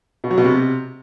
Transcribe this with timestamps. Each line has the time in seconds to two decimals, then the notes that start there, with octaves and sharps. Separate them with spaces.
0.24 B2
0.31 F#3
0.38 B2
0.44 C3